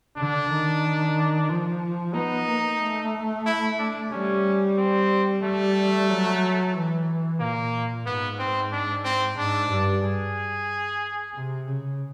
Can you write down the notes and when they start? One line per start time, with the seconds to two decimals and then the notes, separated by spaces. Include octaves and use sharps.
0.17 D3 D4
0.50 D#3
1.49 F3
2.15 B3 D#4
2.47 A#3
2.80 A3
3.46 E4
3.79 D4
4.12 G3 C#4
4.77 C4
5.43 G3 A3
6.09 F#3
6.74 E3
7.40 A#2 A#3
8.06 G#2 B3
8.39 C4
8.72 D4
9.04 C4
9.38 G#2 D4
9.71 G2
10.03 G#4
11.34 C3
11.67 C#3